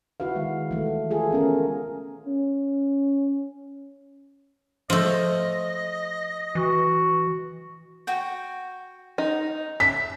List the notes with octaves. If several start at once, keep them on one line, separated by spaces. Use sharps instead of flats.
E4 F#4 B4 F5
D#3 G#3
E3 A3
F4 G#4 A4
B3 C#4 A#4
C#4
F3 A3 D#5
E3 F#4
F#4 G5
D#4
E5 B6